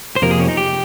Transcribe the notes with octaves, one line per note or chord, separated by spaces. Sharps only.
C5
F2 C3 F3 A#3 A#4
G#4
C#4
D#4
G4